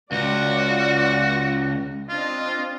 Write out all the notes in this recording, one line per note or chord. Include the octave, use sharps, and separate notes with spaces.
C#2 F4 F#4 D5
C4 D4 F4 D#5